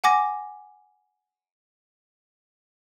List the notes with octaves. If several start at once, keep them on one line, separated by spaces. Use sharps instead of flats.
F#5 G#5 D6 A#6